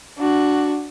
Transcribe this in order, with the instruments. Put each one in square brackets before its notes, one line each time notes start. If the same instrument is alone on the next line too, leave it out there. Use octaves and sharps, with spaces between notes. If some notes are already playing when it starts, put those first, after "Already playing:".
[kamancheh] D4 F#4